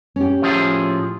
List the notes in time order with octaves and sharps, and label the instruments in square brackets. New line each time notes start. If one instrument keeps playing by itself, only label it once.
[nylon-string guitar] C#4 G4
[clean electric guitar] A2 F3 G#4